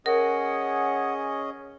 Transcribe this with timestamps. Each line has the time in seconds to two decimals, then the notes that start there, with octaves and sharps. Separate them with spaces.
0.06 C#4 G#4 A#4 D#5 F#5